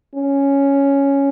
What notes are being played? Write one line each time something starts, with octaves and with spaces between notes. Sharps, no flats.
C#4